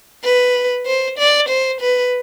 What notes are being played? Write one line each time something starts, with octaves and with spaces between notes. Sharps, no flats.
B4
C5
D5
C5
B4